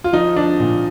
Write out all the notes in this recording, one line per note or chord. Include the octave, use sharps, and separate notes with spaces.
F4
F3 D#4
F3 D4
A#2